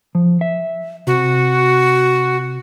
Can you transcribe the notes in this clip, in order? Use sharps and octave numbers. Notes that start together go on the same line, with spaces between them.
F3
E5
C3 F#4